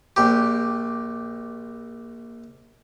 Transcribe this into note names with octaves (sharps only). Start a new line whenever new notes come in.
A#1 G4